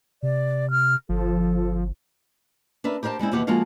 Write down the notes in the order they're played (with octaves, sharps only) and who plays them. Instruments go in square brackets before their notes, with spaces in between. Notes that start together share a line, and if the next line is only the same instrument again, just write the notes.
[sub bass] C3 [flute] D5
[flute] F6
[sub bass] G1 [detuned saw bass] F3 [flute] A4
[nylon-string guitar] D4 A#4 B4 E5
G4 A#4 C5 F5 A5
G3 G#3 C4 E4
D#2 B2 E3 G4 F#5
F3 G#3 A#3 F#4 A4 F5